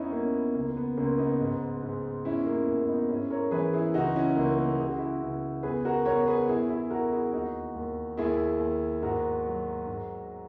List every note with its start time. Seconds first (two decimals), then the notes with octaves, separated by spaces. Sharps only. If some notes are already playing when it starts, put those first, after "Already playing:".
Already playing: E2 B3 C#4 D#4 E4
0.12 E2 A#3 C#4
0.34 B3
0.55 C#2 A#3
0.70 A#3
0.77 B3
0.97 C#2 A#3 C#4
1.18 B3 D#4
1.40 G#2
1.82 G#2
2.24 E2 C#4 E4
2.46 A#3 C#4
2.66 E2 A#3 C#4
2.83 E4
2.88 B3 D#4
3.09 G#2 C#4 E4
3.31 A#4 C#5
3.51 E3 G#4 B4
3.73 E4 G#4
3.94 C#2 D#4 F#4
4.15 C#4 E4
4.36 C#2 A#3
4.58 A#3
4.79 C#2 G#4
4.88 F#4
4.98 E4 G#4
5.22 C#2
5.63 E2 G#4 B4
5.85 F#4 A#4
6.05 E2 A#4 C#5
6.27 G#4 B4
6.49 E2 E4 G#4
6.70 E4 G#4
6.90 E2 F#4 A#4
7.12 E4 G#4
7.33 D#2 D#4 F#4
7.75 D#2
8.17 D#2 E4 G#4
8.60 D#2
9.02 G#2 F#4 A#4
9.45 F#3
9.87 G#2